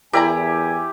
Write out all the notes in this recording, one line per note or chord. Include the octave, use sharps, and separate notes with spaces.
E2 E4 G4 A#4 D5 G#5 A#5